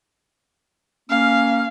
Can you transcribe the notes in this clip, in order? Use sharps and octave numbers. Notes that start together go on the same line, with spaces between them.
A#3 C#4 F5